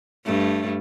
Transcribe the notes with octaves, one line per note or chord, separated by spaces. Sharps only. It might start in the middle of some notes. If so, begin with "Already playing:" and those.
G2 A3